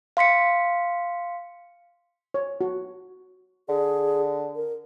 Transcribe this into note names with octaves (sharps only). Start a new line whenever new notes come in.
F5 C6 B6 C#7
C#5
F#4
D3 G#4
A#4